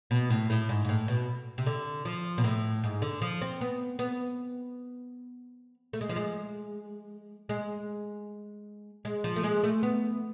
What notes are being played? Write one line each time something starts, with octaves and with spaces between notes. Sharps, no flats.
B2
A2
A2
G#2
G#2
A2
B2
C3
D3
F3
B2
A2
G#2
D3
F3
C4
B3
B3
A3
G#3
F3
G#3
G#3
G#3
F3
A3
G#3
A3
B3